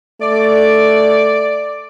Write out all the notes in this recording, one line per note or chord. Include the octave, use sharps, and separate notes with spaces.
A3 D5